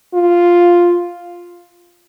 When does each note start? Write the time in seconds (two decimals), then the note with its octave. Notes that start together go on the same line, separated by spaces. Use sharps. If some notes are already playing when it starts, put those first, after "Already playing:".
0.14 F4